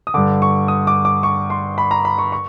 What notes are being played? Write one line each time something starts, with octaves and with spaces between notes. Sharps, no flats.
D#6
G2 D3 D6
C#6
D#6
D6
D6
C#6
C6
B5
A#5
B5
C#6
C#6